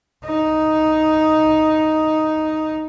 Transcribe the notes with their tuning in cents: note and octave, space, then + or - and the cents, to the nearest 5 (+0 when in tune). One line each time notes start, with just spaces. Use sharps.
D#4 +0